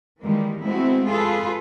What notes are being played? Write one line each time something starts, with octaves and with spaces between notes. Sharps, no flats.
D#3 E3 G3 G#3 A#3
G#3 A3 B3 C4 E4 F#4
F4 G#4 A4 B4